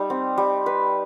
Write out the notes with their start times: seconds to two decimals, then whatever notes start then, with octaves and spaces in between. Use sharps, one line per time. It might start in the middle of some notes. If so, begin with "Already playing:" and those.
Already playing: G3 D#4
0.10 C4
0.38 G3
0.66 B4